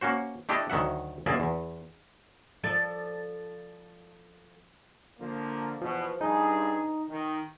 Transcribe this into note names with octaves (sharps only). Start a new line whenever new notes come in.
A#3 C#4 F#4 C5
A3 D4 E4 G4 A4 D#5
D2 D#3 F#3 E5 F#5
G1 F#2 A#3 G#4 D5 E5
E2
F3 A4 D5
D3 F3 A#3
E2 B2 F3
G2 D#4 G#4
D#3